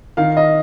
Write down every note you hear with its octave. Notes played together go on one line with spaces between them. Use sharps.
D#3 F5
D#5